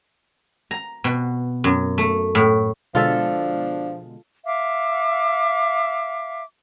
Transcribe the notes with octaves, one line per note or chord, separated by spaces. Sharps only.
A#5
B2
F#2
A3
A2
B2 D3 F3 G#3 D4 F4 A4 E5
E5 F5 D6